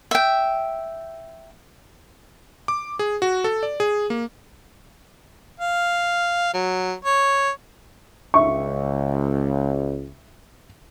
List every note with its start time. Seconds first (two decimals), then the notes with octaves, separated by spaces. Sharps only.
0.11 E5 G5
2.68 D6
2.99 G#4
3.22 F#4
3.44 A4
3.63 D5
3.80 G#4
4.10 A#3
5.60 F5
6.54 F#3
7.05 C#5
8.34 C#2 E5 C#6